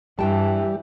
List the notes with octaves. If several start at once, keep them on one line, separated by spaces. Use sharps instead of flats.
G2 E3 G3 G5 A5